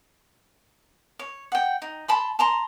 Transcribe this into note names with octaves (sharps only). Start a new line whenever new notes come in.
C#5
F#5 G5
D#4
A5 B5 C6
A5 A#5 C6